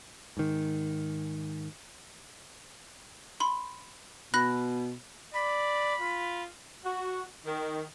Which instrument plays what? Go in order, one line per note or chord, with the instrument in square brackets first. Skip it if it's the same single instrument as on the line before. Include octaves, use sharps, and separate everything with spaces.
[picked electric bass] G#2 D#3
[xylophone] B5 C6
[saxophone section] B2 [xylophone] B5 F#6 A#6
[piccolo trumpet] D5 [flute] B5
[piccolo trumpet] F4
[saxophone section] F#4
D#3